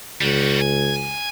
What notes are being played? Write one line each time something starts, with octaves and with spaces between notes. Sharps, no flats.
C#2 G3 F#4
G#5